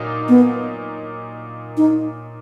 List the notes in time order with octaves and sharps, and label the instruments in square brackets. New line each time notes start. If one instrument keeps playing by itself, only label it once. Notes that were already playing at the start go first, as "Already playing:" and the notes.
Already playing: [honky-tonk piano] A#2 F#3 A#3 D#4
[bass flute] B3
D#4